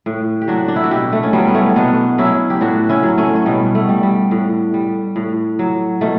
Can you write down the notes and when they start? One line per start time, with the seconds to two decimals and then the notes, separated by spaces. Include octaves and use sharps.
0.06 A2
0.42 G4
0.48 F#3 D4 F#4
0.68 D4
0.76 E4
0.84 F#4
0.91 B2 E4 G4
1.13 A3
1.23 C#4
1.33 F#3 G3 B3
1.47 B3
1.54 A3 C#4
1.76 B2 B3 D4
2.18 F#3 C#4 E4
2.50 G4
2.61 A2 D4 F#4
2.89 C#4 E4
3.03 F#3
3.18 A3 C#4
3.36 C#4
3.46 B2 G3 B3
3.75 A3
3.89 G3
4.03 G3
4.31 A2
4.74 G3
5.16 A2
5.59 F#3
6.01 B2 A3